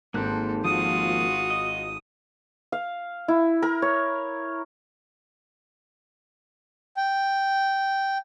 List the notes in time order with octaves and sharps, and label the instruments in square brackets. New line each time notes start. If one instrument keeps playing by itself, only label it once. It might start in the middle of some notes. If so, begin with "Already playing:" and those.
[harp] G#1 C4 [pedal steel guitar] A#3 F#6 [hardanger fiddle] A4
[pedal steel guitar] F3 A#3 [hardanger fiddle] F4 F#4 [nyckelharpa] D#6
[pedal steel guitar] D#5
[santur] F5
E4
A#4
C#5
[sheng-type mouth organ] G5